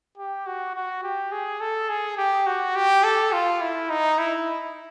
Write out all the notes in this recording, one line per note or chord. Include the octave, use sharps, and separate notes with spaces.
G4
F#4
F#4
G4
G#4
A4
G#4
G4
F#4
G4
A4
F4
E4
D#4
E4